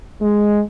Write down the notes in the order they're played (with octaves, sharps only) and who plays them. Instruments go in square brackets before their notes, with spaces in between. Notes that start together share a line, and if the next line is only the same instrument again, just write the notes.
[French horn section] G#3